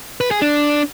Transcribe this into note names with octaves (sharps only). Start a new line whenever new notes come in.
B4
G#4
D4